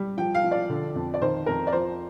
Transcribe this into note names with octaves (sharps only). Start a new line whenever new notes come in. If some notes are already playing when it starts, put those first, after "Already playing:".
Already playing: G3
F3 G5
F5
F3
D5
D3
F2
D5
D#3 C5
F2 A#4
D5
F3 C5